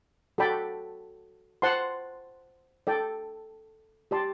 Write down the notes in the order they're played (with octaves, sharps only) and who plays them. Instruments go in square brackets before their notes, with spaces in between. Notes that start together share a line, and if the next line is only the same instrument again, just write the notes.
[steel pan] F#4 A4 D5 G5 B5
C5 F#5 A5 C6
A4 D5 G5
G4 D5 A5 C6